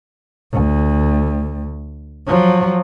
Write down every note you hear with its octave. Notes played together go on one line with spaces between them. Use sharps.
D2
F3 F#3